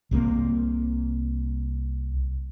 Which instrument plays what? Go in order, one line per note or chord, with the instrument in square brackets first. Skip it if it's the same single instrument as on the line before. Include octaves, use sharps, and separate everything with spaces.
[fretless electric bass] C2 C3 G3 A#3